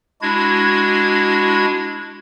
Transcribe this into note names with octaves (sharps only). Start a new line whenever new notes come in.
G#3 D4 E4 F#4 G#6